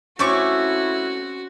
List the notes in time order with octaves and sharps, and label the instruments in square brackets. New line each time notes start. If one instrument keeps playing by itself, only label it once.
[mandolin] A3 C#6 D6 [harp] C4 C#4 [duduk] E4 [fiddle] F#4